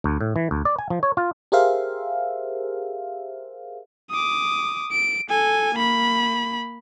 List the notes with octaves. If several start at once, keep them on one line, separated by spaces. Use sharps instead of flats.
D2
A2
E3
D2
D5
G#5
F3
C#5
F4
G4 G#4 A#4 C5 E5 F5
D6 D#6
D7
A4 G#5
A#3 B5